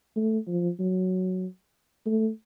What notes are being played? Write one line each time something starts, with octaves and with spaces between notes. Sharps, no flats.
A3
F3
F#3
A3